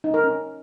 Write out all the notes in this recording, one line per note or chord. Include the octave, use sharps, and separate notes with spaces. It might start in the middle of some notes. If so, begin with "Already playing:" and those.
D#4
A#4
C#4